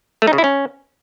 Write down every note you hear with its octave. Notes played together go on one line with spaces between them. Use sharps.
A3
D#4
C#3
E4
C#4